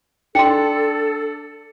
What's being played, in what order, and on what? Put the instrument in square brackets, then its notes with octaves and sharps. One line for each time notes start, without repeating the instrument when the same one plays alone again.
[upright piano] D4 [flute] A4 [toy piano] G5 C6 [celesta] C#7